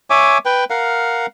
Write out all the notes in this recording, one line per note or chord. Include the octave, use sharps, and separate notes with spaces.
C#5 E5 G#5 D6
B4 G5
A#4 F5 F#5